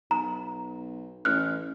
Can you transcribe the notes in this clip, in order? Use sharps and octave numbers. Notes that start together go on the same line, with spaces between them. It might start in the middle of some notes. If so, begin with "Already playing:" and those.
B1 A#5
A1 F6 F#6